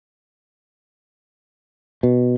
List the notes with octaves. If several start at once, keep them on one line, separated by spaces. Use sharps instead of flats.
B2